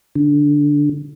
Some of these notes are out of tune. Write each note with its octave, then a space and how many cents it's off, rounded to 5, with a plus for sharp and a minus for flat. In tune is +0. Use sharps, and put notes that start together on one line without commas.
D3 -5